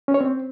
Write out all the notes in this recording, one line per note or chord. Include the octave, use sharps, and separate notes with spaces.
C#4
C#5
C4